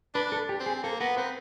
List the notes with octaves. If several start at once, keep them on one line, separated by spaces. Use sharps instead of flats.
D4 B4
A4
G4
C4
G#4
A#3 A4
B3 A#4
C4 B4